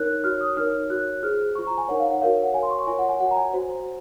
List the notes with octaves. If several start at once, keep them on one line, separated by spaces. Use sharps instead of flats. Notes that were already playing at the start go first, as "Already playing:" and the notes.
Already playing: D#4 A#4 C#5 F#6
F#4 C#5 F6
D#6
D#4 A#4 C#5 F6
F#4 C#5 F#6
F4 G#4 C5 F6
F4 C5 C#6
A#5
G#5
D#4 A#4 C#5 F#5
F5
F#5
F#4 A#4 C#5 F5
F#5
F#4 A#4 C#5 G#5
C6
C#6
F4 A#4 C#5 G#5
F#5
G#5
F#4 C#5 F#5
A#5
G#5
F#4 C5